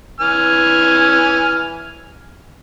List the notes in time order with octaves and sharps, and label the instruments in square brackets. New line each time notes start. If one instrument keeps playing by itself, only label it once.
[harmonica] E3 G#5 F6